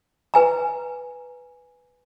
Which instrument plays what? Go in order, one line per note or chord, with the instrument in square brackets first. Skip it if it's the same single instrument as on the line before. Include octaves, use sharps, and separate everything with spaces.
[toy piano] B4 G#5 A#5